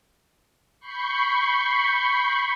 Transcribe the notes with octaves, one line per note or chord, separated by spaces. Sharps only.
B5 C#6 G6 C7 C#7